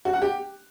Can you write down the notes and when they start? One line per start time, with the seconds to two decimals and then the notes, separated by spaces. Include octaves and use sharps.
0.05 F#4
0.13 F#5
0.22 G4